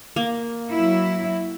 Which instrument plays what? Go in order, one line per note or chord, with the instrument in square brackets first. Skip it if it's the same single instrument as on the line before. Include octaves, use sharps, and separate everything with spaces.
[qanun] A#3
[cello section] F#3 E4